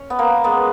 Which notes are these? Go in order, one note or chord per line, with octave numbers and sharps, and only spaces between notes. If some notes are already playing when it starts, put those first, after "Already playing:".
Already playing: C#4
B3
A#3
G#3 B3